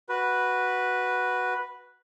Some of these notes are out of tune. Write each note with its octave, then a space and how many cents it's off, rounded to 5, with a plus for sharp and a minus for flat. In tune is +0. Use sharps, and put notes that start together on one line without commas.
F#4 +0 B4 -5